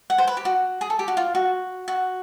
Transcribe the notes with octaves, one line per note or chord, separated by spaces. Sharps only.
F#5
C5
B4
G4
F#4
G#4
A4
G4
F#4
F4
F#4
F#4